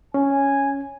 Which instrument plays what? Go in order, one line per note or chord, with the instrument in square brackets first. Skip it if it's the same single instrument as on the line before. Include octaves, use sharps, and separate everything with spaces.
[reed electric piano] C#4 [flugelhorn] G#5